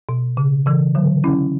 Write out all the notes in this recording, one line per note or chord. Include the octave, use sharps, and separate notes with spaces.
B2
C#3
C#3 E3
D3 F#3
C#4 E4